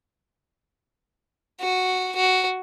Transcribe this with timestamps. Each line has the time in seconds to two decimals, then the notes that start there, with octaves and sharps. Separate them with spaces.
1.61 F#4
2.15 F#4